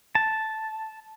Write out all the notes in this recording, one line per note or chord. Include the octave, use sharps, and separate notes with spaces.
A5